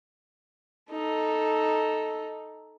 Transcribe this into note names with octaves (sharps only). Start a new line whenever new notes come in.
D#4 A4